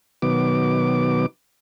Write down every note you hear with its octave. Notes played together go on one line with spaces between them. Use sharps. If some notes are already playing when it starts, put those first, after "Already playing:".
B2 D#3 F#3 B3 D6